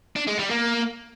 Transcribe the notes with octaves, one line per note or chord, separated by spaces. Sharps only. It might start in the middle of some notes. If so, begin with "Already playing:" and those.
D4
G#3
G3
A#3